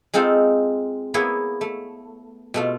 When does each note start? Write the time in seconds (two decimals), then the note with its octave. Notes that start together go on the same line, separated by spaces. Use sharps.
0.14 G#3 C4 D#4 F4 A4
1.14 A#3 B3 E4 G#4 C#5
1.61 A3
2.54 B2 A3 F4